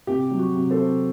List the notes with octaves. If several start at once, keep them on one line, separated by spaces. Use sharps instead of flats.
C3 G4
F#3
F#4
C3
A4 C5
C3